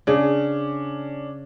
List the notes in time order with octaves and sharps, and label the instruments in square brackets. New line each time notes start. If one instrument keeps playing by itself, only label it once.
[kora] C#3 G#4 [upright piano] C#4 D4